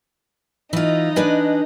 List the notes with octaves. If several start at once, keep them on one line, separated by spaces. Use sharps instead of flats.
E3 D#4 F4 D#5
D4 B4 G#5